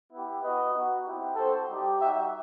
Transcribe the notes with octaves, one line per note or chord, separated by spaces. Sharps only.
B3 E4 G4
B3 F#4 B4 D#5
B3 D#4 F#4
C4 E4 G4
C4 F#4 A4 C5
G3 D#4 G4
G3 D#4 F#4 E5 G5